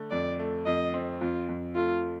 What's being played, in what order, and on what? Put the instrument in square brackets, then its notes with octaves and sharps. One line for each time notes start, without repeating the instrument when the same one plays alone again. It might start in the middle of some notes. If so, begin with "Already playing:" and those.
Already playing: [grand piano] D3 A3
[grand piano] F2 [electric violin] D5
[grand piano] A3
[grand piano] F2 [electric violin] D#5
[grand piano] C4
[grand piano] F2 [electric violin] F4
[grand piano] F2
[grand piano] A3 [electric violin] F4